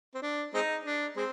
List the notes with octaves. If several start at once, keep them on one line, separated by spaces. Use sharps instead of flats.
C4
D4
G#3 C4 D#4
D4
G#3 C4